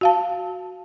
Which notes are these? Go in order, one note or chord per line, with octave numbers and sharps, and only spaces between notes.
F#4 F5 A5